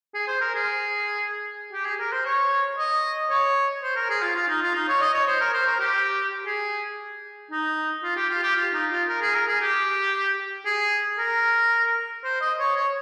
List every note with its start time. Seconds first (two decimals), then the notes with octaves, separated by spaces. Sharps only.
0.14 G#4
0.28 C5
0.41 A#4
0.55 G#4
1.73 G4
1.85 G#4
1.99 A#4
2.12 C5
2.25 C#5
2.78 D#5
3.30 C#5
3.83 C5
3.96 A#4
4.10 G#4
4.22 F4
4.35 F4
4.48 D#4
4.62 F4
4.75 D#4
4.88 C#5
5.01 D#5
5.14 C#5
5.27 C5
5.41 A#4
5.54 C5
5.67 A#4
5.80 G4
6.46 G#4
7.51 D#4
8.03 F4
8.16 G4
8.29 F4
8.43 G4
8.56 F4
8.73 D#4
8.91 F4
9.08 A#4
9.22 G#4
9.34 A#4
9.48 G#4
9.61 G4
10.66 G#4
11.18 A#4
12.24 C5
12.41 D#5
12.59 C#5
12.76 C#5